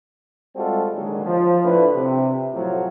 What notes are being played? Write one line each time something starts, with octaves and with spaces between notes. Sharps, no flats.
G3 G#3 C4 F4 F#4 A4
A#2 D3 D#3 F#3 G#3
F3
A2 D3 B4
C3
A2 F3 F#3